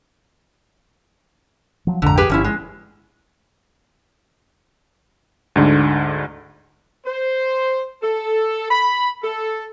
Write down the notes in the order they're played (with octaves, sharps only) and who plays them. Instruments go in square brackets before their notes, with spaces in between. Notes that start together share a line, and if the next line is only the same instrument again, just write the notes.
[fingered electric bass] F3 F#3
[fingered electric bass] A#1 F2 G#2 [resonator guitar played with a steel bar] D3 A#5
[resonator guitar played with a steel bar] G4 G#4 B4
[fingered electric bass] G1 [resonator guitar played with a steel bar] F3 C#4 E4
[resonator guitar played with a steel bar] G#3
[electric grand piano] D2 G#2 D3
[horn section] C5
A4
B5
A4